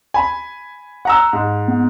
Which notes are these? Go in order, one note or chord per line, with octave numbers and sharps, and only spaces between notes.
G#5 B5
F#5 A#5 E6
G#2
B3